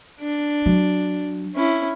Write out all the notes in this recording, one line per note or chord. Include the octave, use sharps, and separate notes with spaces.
D4
F#3
C#4 E4